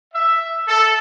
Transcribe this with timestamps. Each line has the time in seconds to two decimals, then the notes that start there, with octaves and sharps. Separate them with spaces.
0.14 E5
0.68 A4